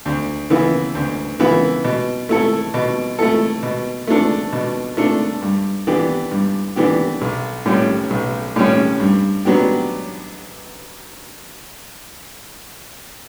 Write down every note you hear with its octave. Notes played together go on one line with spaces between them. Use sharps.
D2
C#3 E3 B3 E4
D2
C#3 E3 B3 E4
B2
A3 E4 A4
B2
A3 E4 A4
B2
A3 D4 A4
B2
A3 D4 A4
G2
E3 B3 D4 G4
G2
E3 B3 D4 G4
B1
A2 G3 C#4
B1
A2 G3 C#4
G2
F#3 B3 D4 G4